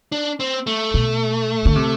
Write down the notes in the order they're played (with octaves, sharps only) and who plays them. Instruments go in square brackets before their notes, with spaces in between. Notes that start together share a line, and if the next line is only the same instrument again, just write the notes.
[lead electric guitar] D4
C4
A3
[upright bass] B2
D3
C3